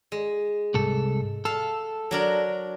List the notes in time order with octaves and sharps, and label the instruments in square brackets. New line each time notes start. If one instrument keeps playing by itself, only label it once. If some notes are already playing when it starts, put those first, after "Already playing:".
[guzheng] G#3
[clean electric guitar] C2 G#2 A4
[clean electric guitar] A4 [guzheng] F5
[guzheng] F#3 D4 A#4